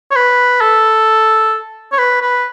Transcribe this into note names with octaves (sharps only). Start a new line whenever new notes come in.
C#5
B4
A4
C#5
B4
B4